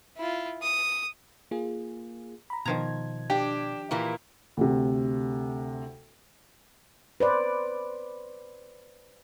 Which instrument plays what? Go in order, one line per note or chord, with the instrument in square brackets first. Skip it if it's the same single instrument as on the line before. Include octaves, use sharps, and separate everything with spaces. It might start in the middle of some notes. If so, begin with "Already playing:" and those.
[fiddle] E4 F4
D#6
[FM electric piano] A#3 F4 G#4
A#5 B5
[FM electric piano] B2 G#6 [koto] D#3 F3 A#5
[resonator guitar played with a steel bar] D4 [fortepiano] G4
[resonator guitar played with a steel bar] A#2 E3 A#3
[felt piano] D2 C3
[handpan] B4 C5 D5